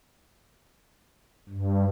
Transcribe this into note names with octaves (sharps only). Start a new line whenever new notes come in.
G2